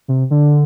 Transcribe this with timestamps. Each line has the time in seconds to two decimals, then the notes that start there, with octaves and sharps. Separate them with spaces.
0.08 C3
0.31 D3